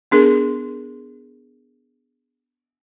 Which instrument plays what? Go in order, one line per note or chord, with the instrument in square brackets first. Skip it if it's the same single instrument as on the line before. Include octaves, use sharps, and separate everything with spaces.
[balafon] B3 D4 G#4 A#4